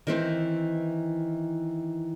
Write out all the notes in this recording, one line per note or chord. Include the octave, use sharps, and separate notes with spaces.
D#3 E3 C4